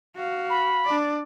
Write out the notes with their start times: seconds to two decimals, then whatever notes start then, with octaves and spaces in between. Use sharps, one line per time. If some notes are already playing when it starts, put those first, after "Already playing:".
0.16 F#4 F5
0.50 B5
0.85 D4 D5